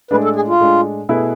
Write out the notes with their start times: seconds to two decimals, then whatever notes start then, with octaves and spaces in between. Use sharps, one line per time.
0.11 A2 G#3 D4 B4
0.24 A4
0.36 G#4
0.48 F4
0.60 A2 G#3 D4
1.09 B2 A3 E4 G#4 B4